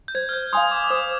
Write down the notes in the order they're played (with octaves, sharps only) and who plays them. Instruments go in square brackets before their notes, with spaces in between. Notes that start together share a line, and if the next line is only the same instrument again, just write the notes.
[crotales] G6
[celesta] C5 [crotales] G#6
[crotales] F6
G6
[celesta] F5 G#5 C6 [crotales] D#6
[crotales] D6
D6
[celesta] C5 [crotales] D#6